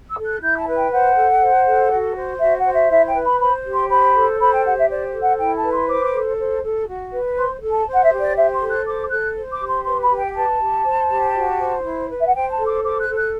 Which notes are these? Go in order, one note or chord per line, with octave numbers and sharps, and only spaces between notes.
E6
A4
F#6
E4 G6
A5
B4
G5
C5 F#5
A4
C5
A4
F#4
C5
F#4 E5
F#5
C5
E5
E4 E5
G5
B4
B5
C5 B5
G4
C6
C5 B5
A4
C5 B5
G5
G4 F#5
E5
C5 D5
A4
F#5
E4 G5
A5
B4
C6
C5 D6
D6
A4
C5
A4
F#4
B4
C5 C6
A4
A5
C5
F#5
E5
G4
D5
C5 E5
C6
A4
F#6
C5 D6
A4 F#6
C5
D6
G4
C6
B4 C6
B5
G4
G5
B4 A5
G4
C5
G4
F#4
C5
E4
B4
E5
F#5
C5 G5
A5
A4
D6
C5 D6
F#6
A4
F#6